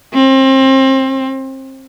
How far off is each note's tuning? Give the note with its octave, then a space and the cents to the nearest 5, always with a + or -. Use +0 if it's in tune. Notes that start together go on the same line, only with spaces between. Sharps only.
C4 +30